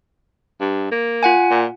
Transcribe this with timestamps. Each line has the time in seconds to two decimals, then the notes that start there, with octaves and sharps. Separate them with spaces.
0.60 G2
0.91 A#3
1.23 F4 F#5 G#5
1.51 A#2